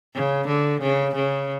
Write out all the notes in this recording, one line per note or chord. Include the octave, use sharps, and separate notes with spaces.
C#3
D3
C#3
C#3